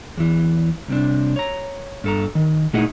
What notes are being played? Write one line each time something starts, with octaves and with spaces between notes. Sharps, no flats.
E2 E3
C2 C3 D4
C#5 A#5
G2 A4 A#5
D#3
A#2 A3 D#4 E4 G#4 F#5